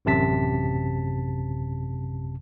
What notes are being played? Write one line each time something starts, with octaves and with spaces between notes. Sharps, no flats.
A1 F#2 C3 A5 B6